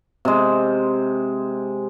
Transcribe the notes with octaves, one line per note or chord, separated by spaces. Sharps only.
C3 G#3